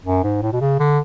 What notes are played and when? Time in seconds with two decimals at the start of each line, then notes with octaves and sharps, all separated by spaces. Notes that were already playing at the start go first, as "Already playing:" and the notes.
0.06 F#2
0.24 G#2
0.42 A2
0.53 B2
0.61 C#3
0.80 D3